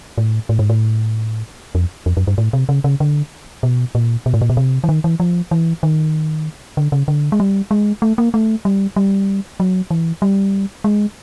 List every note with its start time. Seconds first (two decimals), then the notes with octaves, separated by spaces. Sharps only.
0.18 A2
0.49 A2
0.59 G#2
0.70 A2
1.75 F2
2.06 F2
2.17 F#2
2.27 G2
2.38 A2
2.53 C3
2.69 C#3
2.84 C#3
3.00 D3
3.63 B2
3.95 A#2
4.26 B2
4.34 A2
4.41 A#2
4.50 B2
4.57 C3
4.84 E3
4.89 D#3
5.04 E3
5.20 F3
5.51 E3
5.83 D#3
6.77 D3
6.92 C#3
7.08 D3
7.32 G#3
7.40 G3
7.71 G#3
8.02 A3
8.18 A#3
8.34 A3
8.65 G3
8.96 G3
9.60 F#3
9.91 E3
10.22 G3
10.84 G#3